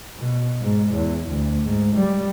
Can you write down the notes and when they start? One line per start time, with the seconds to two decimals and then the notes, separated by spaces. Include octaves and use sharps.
0.19 B2
0.61 G#2
0.94 E2
1.30 D2
1.66 G#2
1.96 G3